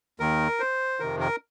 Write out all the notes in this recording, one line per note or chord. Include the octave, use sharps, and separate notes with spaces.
D#2 D#3 A#4
C5
F2 C3 D#3 A#4
A#4